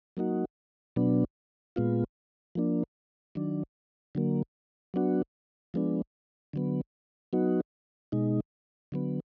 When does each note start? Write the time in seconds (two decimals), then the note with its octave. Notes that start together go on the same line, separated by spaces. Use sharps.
0.17 F#3 A#3 D#4 F#4
0.96 B2 F#3 B3 D4
1.76 A#2 G#3 B3 F4
2.55 F3 A#3 D4
3.35 D#3 F#3 D4
4.15 D3 F#3 A#3
4.94 F#3 B3 D4 F#4
5.74 F3 G#3 B3 D4
6.53 D3 F#3 B3
7.33 F#3 B3 D#4 F#4
8.12 B2 G#3 D#4
8.92 D3 F#3 B3